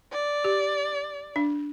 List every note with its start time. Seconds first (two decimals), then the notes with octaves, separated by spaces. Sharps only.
0.12 D5
0.44 G4
1.36 D4